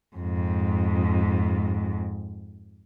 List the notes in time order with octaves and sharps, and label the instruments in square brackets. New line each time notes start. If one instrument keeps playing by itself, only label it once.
[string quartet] F2 G#2